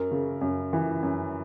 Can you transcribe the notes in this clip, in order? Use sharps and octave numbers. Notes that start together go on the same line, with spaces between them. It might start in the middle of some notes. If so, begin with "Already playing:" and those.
Already playing: F#2 A#4
C#3
F#2
E3
F#2